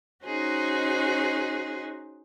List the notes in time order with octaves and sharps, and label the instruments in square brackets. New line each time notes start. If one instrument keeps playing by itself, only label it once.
[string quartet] C#4 D#4 F#4 G#4 C5